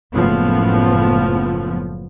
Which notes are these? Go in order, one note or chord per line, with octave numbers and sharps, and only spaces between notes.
F#1 A2 F3 B3